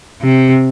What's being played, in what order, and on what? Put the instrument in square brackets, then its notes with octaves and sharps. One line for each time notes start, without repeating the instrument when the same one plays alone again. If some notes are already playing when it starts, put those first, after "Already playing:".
[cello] C3